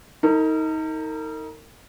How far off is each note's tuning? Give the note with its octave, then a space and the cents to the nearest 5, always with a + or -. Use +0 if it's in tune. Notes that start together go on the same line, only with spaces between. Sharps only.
D#4 +30 A#4 -40